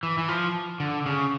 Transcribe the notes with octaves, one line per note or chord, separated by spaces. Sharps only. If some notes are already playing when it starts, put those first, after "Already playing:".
E3
E3
F3
D3
C#3